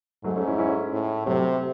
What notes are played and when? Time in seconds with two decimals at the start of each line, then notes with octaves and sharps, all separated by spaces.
0.24 G#2 F#3 A3
0.36 A3 C#4
0.47 C#4 E4
0.58 C#4 E4
0.92 A2
1.26 C3 F#3 A3